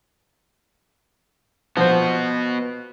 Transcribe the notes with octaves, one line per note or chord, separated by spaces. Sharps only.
F3 B3 F#4 C5